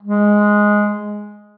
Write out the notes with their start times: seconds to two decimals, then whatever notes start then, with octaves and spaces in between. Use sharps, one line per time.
0.02 G#3